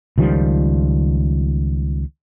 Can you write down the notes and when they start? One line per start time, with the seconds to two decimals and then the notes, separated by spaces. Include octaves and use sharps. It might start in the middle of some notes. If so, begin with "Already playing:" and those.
0.18 C#2 D#3 F3 G3